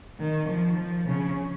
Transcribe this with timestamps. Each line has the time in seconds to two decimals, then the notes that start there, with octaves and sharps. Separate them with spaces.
0.19 D#3
0.49 F3
0.79 F3
1.08 C#3